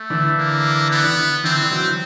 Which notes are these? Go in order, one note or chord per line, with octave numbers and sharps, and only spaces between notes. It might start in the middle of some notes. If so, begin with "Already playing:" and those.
Already playing: A3
D3 E3
A#3
B3
D3 E3 C4
E3 F#3